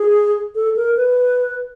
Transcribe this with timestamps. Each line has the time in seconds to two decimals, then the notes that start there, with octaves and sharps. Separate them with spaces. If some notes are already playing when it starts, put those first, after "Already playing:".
Already playing: G#4
0.55 A4
0.76 A#4
0.97 B4